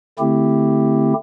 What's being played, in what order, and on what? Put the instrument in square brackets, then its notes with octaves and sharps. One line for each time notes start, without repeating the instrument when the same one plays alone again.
[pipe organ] D3 A3 C4 E4 G4